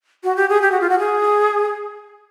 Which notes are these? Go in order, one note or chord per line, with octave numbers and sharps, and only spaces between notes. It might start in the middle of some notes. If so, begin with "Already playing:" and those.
F#4
G4
G#4
G4
F#4
F4
F#4
G#4